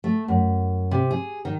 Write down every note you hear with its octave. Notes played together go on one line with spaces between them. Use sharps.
A3
F#2
C3
G#4
D#3